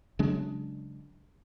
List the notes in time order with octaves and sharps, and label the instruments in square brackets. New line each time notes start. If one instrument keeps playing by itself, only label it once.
[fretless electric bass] C#3 F#3 G#3 D4